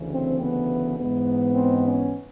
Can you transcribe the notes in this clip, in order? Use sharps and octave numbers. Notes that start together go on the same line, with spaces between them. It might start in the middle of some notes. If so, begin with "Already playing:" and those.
Already playing: D2 C#3 E3
C4
B3
G#2 E3 G#3 B3
C4
C#4